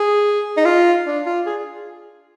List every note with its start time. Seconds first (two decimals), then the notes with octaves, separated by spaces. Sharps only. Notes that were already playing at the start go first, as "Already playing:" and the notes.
Already playing: G#4
0.57 D#4
0.65 F4
1.06 D4
1.26 F4
1.46 G#4